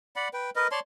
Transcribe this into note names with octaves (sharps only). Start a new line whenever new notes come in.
D5 F#5 B5
B4 G5
A#4 B4 D#5
C#5 D5 A5 C6